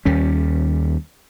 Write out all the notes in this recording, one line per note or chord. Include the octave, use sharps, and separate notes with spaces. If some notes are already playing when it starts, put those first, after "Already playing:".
D#2 G3 C#4